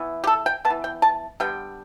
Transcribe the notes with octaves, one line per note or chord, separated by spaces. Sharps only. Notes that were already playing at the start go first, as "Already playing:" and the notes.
Already playing: E3 B3
G4
A4
G5
B3 A5
E3
G5
A5
D3 G3 B3 G5